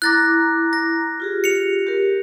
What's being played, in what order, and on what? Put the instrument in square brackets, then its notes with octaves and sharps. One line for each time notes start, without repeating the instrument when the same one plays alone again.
[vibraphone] E4 A#5 D6 [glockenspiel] F#6 A6 A#6
[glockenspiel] A#6
[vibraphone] F4 G4 G#4
[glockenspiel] C#7 F7
[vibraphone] G4 A#4